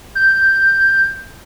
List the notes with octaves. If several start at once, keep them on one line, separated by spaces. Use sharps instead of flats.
G6